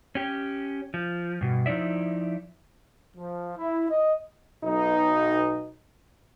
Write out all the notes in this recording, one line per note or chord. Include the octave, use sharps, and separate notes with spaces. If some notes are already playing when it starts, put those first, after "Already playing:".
C#4 G4
F3
G2 B2
F3 D#4 E4 D5 E5
F3
E4
D#5
B1 D#4